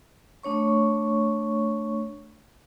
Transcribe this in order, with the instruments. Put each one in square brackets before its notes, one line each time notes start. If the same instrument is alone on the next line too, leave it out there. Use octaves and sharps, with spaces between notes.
[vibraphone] A3 D4 C#5 C#6